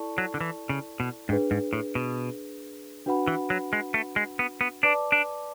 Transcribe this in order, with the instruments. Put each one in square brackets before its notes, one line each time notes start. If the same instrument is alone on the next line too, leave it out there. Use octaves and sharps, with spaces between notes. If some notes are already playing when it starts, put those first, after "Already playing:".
Already playing: [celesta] E4 A4 D5 A5 C#6
[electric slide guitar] F#3
D3
E3
C#3
B2
[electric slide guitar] G#2 [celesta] D4 G#4 B4
[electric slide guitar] G#2
A2
B2
[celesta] D4 F#4 B4 F#5 B5
[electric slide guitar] E3
F#3
G#3
A3
G#3
B3
B3
[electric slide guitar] D4 [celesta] B4 D5 A5 D6
[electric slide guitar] D4